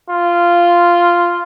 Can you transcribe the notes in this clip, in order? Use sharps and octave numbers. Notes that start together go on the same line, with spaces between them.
F4